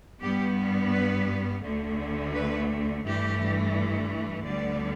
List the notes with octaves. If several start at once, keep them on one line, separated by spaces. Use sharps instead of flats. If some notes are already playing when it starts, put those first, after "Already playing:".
G2 G3 B3 G4
B4
D2 D3 A3
B4
G2 E3 A3 G4
D2 D3 G3 B3 D5